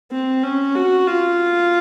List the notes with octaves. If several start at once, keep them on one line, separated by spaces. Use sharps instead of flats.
C4
C#4
F#4
F4